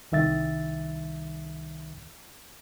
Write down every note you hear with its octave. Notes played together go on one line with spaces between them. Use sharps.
C2 D#3 E5 A6